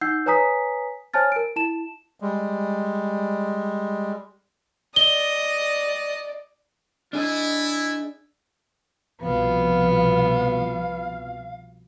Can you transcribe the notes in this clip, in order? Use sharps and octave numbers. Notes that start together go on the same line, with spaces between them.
D#4 F#5 E6 G6 C7
B4 C#5 G#5 A#5 D#6 B6
C5 C#5 G#5 A5 F6 A6
A#4 D7
E4 A5 E7
G3 G#3
D5 D#5 G7
A3 D4 E4 G#4 D#5
C2 B2 F3 B3 F5